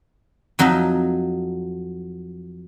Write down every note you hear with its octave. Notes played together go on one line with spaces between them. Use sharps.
F2 F#3 D#4 D#5 E5